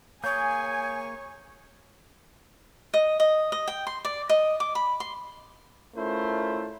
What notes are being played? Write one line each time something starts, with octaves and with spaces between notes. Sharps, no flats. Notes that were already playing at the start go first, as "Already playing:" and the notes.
A#3 G#4 C#5 G#5 G6
D#5
D#5
D#5
G5
C6
D5
D#5
D6
B5
C6
A3 C#4 E4 F4 A#4 C5